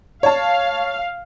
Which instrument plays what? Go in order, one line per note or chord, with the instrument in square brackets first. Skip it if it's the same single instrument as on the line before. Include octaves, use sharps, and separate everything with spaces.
[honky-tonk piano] C#5 A5 [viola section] F5